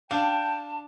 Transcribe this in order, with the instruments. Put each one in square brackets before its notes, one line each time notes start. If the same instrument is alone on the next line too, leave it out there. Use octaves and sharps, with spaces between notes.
[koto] D4 [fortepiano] F5 [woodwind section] G5 [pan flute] A5